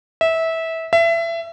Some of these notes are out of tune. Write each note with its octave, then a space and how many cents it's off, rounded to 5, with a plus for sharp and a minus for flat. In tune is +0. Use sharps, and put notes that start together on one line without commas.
E5 -20
E5 +25